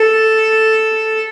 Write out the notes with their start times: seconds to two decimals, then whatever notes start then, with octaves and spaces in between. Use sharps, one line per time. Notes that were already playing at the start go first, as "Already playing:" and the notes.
Already playing: A4